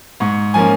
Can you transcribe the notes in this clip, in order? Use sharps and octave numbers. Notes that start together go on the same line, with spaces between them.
G#2 C#6
F3 A#3 C#4 G#5